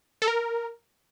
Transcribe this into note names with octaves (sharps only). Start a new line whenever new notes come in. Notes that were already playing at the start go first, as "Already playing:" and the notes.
A4
A#4